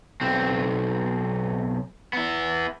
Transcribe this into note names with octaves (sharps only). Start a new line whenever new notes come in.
B1 C4
B3 E4